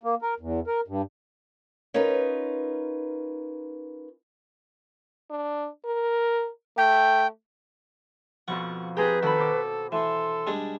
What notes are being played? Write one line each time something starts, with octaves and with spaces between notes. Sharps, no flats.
A#3
A#4
E2
A#4
G2
C#4 D#4 F4 A#4 B4
D4
A#4
A3 G5
F2 B2 F3 F#5 C#6
C4 G4 G#4 B4 A#5 G6
D#3 F#4 A4 B5
B2 C5 D6
E3 A4 C6
G3 G#3 D4